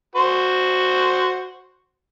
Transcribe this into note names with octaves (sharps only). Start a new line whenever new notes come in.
F#4 C5